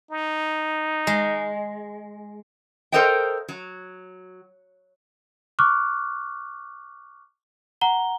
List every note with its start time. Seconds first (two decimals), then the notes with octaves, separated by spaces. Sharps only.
0.11 D#4
1.07 G#3
2.92 A4 A#4 C5 D#5 F5 G5
3.49 F#3
5.59 C#6 D6 F6 F#6
7.81 F#5 A#5 G7